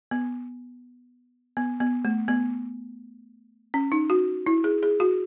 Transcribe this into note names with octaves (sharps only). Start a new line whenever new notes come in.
B3
B3
B3
A3
B3
C#4
D#4
F#4
E4
G#4
G#4
F#4